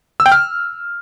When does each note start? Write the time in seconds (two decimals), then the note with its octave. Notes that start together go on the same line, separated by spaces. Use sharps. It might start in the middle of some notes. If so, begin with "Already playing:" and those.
0.20 E6
0.26 G5
0.32 F6